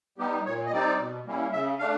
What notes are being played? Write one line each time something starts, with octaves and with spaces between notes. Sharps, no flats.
G3 B3 D#4 G4
A#2 C#5
D#5
G3 C4 D#4 D5
B2
G3 A#3 C#4 E4
C#3 E5
A3 D4 F5